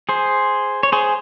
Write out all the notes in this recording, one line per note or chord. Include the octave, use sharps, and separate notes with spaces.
G#4 C5
C#5
G#4 C5